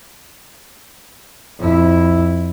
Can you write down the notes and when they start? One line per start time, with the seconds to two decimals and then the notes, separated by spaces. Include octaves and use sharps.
1.59 F2 E4